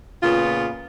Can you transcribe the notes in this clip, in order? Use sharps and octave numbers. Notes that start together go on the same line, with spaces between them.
A#2 C#3 B3 F4